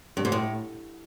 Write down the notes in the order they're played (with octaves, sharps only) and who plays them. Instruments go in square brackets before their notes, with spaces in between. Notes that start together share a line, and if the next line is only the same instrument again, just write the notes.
[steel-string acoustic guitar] G2
G#2
A2